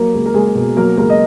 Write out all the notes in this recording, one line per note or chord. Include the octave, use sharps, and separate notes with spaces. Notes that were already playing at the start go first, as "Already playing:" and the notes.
Already playing: F#3 A#3 A#4
C#2
A#4
C#2 G#3 G#4
B2
F#3 A#3 A#4
C#2 A#3 A#4
D#5